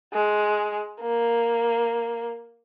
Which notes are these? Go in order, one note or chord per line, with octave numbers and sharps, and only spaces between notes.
G#3
A#3